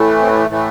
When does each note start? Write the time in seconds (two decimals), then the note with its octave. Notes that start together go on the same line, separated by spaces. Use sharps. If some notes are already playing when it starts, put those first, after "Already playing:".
Already playing: A2 E3 A3
0.21 C4
0.48 A2 E3 A3